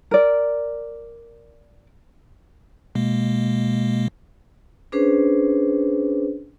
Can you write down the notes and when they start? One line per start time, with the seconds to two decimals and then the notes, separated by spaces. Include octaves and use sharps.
0.11 A#4 D5
2.95 B2 G#3 A#3
4.92 C#4 D4 G#4 B4 C5